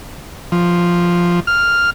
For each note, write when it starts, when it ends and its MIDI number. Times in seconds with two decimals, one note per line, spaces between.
0.52 1.40 53
1.47 1.90 89